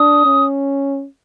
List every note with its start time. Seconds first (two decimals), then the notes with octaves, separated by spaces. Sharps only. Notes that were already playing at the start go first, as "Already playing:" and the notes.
Already playing: D4 D#6
0.25 C#4